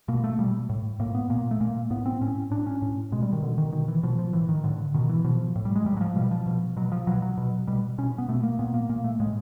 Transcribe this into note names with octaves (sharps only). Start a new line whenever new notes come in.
B2 A#3
A3
B2 G3
A2
A2 A#3
B3
A#2 A#3
A3
A#2 A#3
A2 B3
C4
A2 C#4
A2 D4
C#4
A2
B2 G#3
G3
D#3
B2 D3
D#3
B2 D#3
E3
B2 F3
F3
A2 E3
D#3
A2 D3
B2 D#3
E3
B2 F3
A2
G3
G#3
A2 G3
F#3
F3
B2 G3
F3
B2
B2 F#3
F3
B2 F#3
F#3
B2
B2 G3
B2 C#4
B3
B2 A3
A#3
A#2 B3
A#3
A#2 A#3
A3
A2 G#3